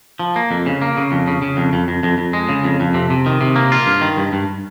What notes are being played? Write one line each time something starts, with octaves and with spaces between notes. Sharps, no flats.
F3
A#3
F2
C#3
A#3
C#3
F2
C#3
C#3
F2
F2
F2
F2
F2
G#3
C#3
F2
F2
C3
C3
D#3
C3
A#3
F4
G2
D#3
G2
G2